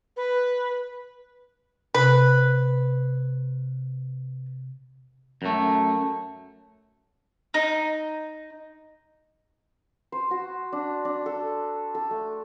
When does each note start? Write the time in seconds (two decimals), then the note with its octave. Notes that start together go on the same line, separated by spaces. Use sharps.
0.17 B4
1.94 C3 B4
5.42 F#2 A3
7.54 D#4
10.12 C5
10.31 F#4
10.72 D4
11.05 D4
11.26 A4
11.95 A4
12.11 A3